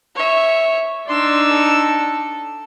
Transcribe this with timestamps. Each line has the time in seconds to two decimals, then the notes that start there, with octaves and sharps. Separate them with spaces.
0.15 C#5 E5
1.08 D4 D#4 C6 E6
1.50 A4